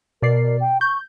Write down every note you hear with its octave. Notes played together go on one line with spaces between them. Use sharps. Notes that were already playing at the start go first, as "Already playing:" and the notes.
B2 A#4 D5 C7
G5
C#6 G6